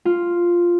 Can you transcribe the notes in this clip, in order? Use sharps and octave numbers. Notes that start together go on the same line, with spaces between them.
F4